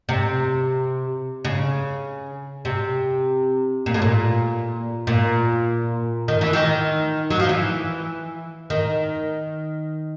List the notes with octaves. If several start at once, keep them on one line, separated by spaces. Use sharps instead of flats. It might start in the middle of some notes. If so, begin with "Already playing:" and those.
C3
C#3
C3
A#2
A2
A#2
A#2
D#3
E3
D#3
F#3
F3
E3
D#3